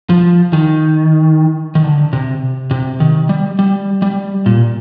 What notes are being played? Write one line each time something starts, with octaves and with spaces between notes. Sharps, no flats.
F3
D#3
D#3
D3
C3
C3
D#3
G3
G3
G3
A#2